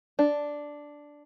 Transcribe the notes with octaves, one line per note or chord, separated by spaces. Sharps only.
D4